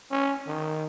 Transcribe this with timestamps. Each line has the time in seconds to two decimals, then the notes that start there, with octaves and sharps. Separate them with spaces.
0.11 C#4
0.47 D#3